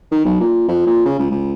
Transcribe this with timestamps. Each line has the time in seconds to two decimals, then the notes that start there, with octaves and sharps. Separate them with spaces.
0.11 D#3
0.25 B1
0.40 A#2
0.68 F2
0.87 A#2
1.06 C#3
1.19 C#2
1.31 C#2